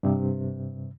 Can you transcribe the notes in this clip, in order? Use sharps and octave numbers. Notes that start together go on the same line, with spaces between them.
G2 C3